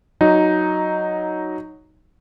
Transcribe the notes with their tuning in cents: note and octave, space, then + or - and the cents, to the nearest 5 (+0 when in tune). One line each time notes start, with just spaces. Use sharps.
F#3 +0 D#4 +0